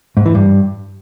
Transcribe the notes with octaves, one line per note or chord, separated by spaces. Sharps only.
G#2
E3
G2